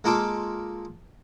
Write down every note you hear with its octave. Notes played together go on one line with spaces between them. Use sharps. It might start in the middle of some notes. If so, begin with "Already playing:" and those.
G#3 A#3 F4 A4 D6